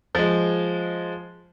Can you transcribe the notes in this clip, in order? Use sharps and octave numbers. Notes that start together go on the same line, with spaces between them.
F3 G#3